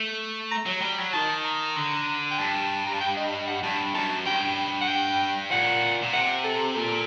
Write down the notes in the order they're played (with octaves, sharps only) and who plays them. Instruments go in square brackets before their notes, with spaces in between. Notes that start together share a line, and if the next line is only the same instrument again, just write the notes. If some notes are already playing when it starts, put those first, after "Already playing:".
Already playing: [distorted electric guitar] A3
[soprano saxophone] A#5
[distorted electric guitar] F#3
G3
F#3
[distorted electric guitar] D#3 [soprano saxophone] A5
[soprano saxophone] A#5
[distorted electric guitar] D3
[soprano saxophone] G5
[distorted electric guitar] G2 [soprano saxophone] A5
[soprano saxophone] A#5
A5
G5
D#5
D#5
F#5
[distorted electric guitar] G2 [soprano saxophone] A5
[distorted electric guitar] F#2 [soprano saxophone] A5
[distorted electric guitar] G2 [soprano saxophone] G5
[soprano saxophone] F#5
G5
[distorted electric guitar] A#2 [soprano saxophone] F#5
[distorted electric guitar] A#2
[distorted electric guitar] C3 [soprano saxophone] F#5
[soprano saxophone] A4
[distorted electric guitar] A#2 [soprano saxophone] A4